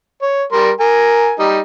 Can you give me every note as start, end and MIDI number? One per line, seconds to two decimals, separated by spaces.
0.22 0.44 73
0.52 0.71 55
0.52 0.71 70
0.52 0.71 84
0.80 1.34 70
0.80 1.34 80
1.39 1.60 55
1.39 1.60 63